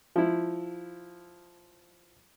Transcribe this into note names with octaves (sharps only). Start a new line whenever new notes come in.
F3 E4